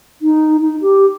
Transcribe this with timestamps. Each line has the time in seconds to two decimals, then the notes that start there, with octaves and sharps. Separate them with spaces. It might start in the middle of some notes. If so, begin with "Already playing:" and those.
0.22 D#4
0.61 D#4
0.81 G4